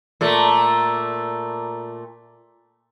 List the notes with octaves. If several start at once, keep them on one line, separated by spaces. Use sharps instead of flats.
A#2 A3